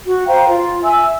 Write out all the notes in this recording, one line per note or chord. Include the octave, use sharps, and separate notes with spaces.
F#4
C5 F5 G5 A#5
F4
E5 G#5 E6